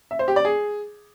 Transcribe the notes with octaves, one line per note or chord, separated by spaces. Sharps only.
E5
C5
G4
D5
G#4